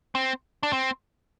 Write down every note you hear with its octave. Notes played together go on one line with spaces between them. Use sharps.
C4
D4
C4